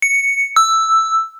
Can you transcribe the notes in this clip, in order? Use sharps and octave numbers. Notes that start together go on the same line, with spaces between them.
C#7
E6